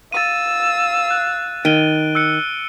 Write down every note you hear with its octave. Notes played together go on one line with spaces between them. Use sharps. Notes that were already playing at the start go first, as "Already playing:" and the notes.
F5 E6 A6 D#7
F#6
D#3 D7 D#7 G7
E6 F#6 C#7